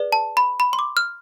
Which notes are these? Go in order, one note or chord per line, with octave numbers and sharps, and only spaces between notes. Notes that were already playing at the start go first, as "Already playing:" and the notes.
Already playing: G#4 B4 D5
A5
B5
B5
C6
D6
F6